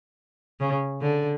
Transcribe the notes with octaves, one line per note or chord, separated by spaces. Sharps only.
C#3
D3